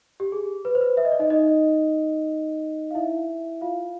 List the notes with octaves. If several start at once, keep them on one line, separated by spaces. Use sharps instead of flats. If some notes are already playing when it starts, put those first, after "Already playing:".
G4
G#4
B4
C5
B4
E5
D#5
D5
D#4 D#5
D#4 D#5
F5
E4 E5
F4 F5